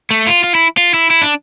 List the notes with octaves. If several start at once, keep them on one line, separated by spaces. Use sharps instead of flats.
A3
F4
F4
E4
F4
E4
E4
D4